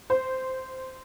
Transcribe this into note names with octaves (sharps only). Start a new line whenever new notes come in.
C5